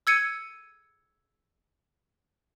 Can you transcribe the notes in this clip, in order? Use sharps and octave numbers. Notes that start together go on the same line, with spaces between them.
E6 G#6 C#7 D#7